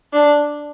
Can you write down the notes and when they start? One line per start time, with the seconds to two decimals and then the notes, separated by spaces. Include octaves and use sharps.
0.13 D4